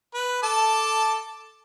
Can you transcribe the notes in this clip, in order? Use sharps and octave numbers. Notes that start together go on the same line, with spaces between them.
B4
A4 A5 D6